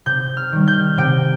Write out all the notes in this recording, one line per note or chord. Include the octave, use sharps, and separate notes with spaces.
C3 G6
F6
D#3 G3
G6
C3 G5